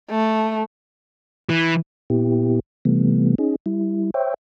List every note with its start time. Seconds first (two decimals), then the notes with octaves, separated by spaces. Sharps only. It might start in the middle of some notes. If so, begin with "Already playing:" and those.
0.10 A3
1.49 E3
2.10 A#2 B3 E4 G4
2.85 C3 E3 G3 A3 B3
3.38 C#4 D#4 G#4
3.66 G3 E4
4.14 C5 C#5 E5 G5